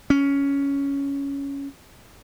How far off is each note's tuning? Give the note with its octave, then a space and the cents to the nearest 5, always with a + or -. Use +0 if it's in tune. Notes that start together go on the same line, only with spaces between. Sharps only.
C#4 +10